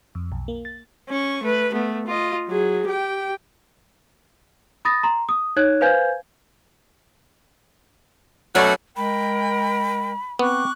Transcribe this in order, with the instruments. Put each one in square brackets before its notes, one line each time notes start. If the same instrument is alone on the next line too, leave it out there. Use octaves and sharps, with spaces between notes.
[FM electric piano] F2
B1
A#3
A6
[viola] C#4 C#6
A3 B4
A3 B3
F4 D#5
F#3 G#4
G4 G5
[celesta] B5 D#6 A6 A#6
A#5 C6
D#6
D#4 C#5 F#6 G#6
B4 C5 F5 G#5 G6 G#6
[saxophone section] B2 A3 F#4 [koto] F#3 C#4 D5
[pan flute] G#3 [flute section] A#4 G5 [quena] B5
[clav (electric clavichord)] B3 [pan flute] C4 [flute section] C#6 D6 F#6